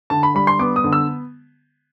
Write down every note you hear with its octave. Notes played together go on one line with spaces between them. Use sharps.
D3 A5
B5
G3 B5
C6
B3 D6
D#6
D3
E6